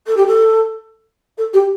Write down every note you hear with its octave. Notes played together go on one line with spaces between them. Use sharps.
A4
G4
A4
A4
G4